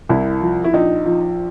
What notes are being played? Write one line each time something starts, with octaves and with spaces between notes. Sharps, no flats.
C2 E4
F3
E4
A#1 D#4
F3